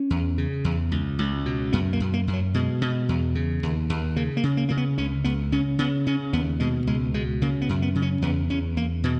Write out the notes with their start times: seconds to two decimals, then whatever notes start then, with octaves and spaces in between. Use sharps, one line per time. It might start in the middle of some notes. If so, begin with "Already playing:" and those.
Already playing: C#4
0.10 E2
0.38 C#3
0.64 E2
0.92 C#2
1.19 C#2
1.46 B2
1.73 F#2 B3
1.93 A#3
2.00 F#2
2.14 A#3
2.28 F#2
2.33 F#3
2.54 B2 G#3
2.81 B2
3.09 E2
3.35 C#3
3.63 D#2
3.90 D#2
4.16 C#3 A#3
4.37 A#3
4.43 C#3
4.57 A#3
4.69 C#3 A#3
4.77 B3
4.98 C#2 C#4
5.24 C#2 B3
5.52 C#3 C#4
5.79 C#3 B3
6.07 C#3 C#4
6.33 D#2 B3
6.60 B2 G#3
6.87 C#2 G#3
7.14 B2 G#3
7.42 C#3 A#3
7.61 B3
7.69 F#2
7.82 B3
7.95 C#3
8.02 C#4
8.22 E2 B3
8.50 E2 C#4
8.77 E2 A#3
9.04 B2 E3